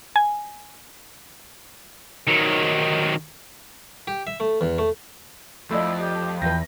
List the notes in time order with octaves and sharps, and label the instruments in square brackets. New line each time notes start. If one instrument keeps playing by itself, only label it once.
[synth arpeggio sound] G#5
[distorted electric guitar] D#3 F#3
[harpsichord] G4
E5
A3
E2
A3
[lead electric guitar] F2 [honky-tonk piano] A3 D5 D#5 [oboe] E4
[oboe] G4
[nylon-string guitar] E2 B4 [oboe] G5 [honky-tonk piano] A#6